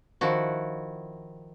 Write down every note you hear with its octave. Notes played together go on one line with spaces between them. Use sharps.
D#3 F3 E4 F#4